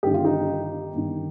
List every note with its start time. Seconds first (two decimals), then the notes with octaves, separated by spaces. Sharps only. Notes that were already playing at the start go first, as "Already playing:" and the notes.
0.03 G1 G2 D#3 G4
0.14 F4
0.25 D#4 G4
0.93 G1 G2 D#3